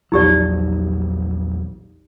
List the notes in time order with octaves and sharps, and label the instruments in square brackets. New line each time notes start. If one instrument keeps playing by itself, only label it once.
[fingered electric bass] A#1 E2 F#3 [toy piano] D#4 G4 D5